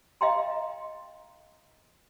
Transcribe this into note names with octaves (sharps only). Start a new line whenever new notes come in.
D#5 F5 G5 A#5 C6